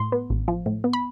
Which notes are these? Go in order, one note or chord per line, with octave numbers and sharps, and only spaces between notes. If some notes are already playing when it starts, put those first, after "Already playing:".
Already playing: A2 C6
B3
A1
F3
A2
B3
B5